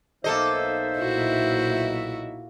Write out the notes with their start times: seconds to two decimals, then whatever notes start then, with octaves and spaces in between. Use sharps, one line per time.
0.24 B1 A#3 D#4 A4 C5 D#5 E5
0.98 A#2 E4 F#4